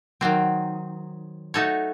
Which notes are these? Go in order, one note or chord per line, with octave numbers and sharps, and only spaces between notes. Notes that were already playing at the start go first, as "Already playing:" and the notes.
D#3 F#3 C4
A3 D#4 F#4 A4 C#5